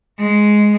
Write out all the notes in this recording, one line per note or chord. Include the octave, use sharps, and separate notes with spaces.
G#3